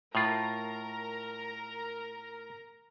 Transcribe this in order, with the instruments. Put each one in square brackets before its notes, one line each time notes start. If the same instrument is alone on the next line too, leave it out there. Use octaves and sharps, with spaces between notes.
[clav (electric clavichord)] A2 F4 [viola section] A#4 A#5